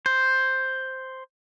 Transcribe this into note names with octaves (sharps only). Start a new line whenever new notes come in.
C5